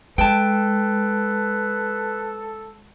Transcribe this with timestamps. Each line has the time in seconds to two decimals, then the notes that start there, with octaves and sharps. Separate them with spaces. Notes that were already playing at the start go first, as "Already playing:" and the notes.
0.18 G#3 A4 B4 G5 A5